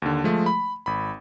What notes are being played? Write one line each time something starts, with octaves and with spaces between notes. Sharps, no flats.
D#2 D3
F3 G#3 A3
B5
G#1 B5